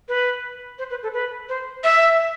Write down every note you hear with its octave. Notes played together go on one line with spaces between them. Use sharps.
B4
C5
B4
A4
B4
C5
E5